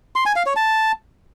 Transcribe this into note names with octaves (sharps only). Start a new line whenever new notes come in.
C6
G#5
F5
C#5
A5